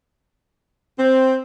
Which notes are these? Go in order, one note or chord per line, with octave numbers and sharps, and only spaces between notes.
C4